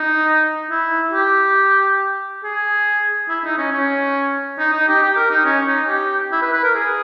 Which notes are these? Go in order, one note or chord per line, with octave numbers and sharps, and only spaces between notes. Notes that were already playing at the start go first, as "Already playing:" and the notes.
Already playing: D#4
E4
G4
G#4
E4
D#4
C#4
C#4
D#4
D#4
G4
G4
A#4
D#4
C#4
D#4
G4
E4
B4
B4
A#4
G#4